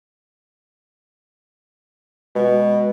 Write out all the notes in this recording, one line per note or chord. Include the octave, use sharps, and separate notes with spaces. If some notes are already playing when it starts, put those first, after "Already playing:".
B2 G#3 F#4